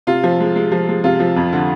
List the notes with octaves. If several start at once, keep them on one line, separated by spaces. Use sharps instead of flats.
C3 F4
F3
G#3
G#3
F3
G#3
C3 F4
F3
F2
D3